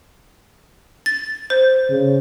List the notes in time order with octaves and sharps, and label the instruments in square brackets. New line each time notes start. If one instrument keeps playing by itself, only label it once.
[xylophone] A6
C5
[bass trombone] C#3